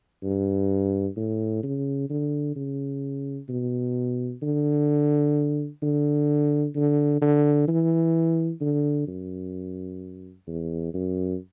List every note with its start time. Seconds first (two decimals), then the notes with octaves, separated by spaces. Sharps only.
0.24 G2
1.17 A2
1.63 C#3
2.10 D3
2.56 C#3
3.49 B2
4.42 D3
5.83 D3
6.75 D3
7.21 D3
7.68 E3
8.61 D3
9.07 F#2
10.48 E2
10.94 F#2